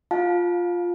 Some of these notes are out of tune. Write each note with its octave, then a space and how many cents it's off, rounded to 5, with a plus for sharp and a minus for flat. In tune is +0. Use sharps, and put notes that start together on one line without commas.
F4 +0 F5 +25 A5 -20